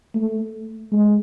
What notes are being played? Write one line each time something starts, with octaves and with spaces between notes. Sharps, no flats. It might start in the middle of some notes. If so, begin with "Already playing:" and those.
A3
G#3